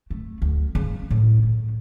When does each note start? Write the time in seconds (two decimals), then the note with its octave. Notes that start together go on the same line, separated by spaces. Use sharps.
0.10 A3
0.42 D2
0.75 C#3
1.10 A2
1.43 A2